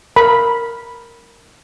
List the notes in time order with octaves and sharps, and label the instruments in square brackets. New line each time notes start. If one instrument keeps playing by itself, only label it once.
[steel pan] A#4 B5